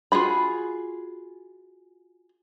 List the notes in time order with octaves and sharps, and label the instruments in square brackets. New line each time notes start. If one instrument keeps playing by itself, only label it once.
[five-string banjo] F4 F#4 G#4 B5